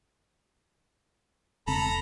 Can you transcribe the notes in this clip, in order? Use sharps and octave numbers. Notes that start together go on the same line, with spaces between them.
E1 C#3 C4 A4 A#5 B5